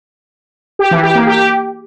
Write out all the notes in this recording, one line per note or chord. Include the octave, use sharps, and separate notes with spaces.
G4
E3
G4
A#3
G4